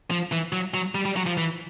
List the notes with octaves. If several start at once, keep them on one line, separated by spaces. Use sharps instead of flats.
F3
E3
F#3
F#3
G3
G3
F#3
F3
E3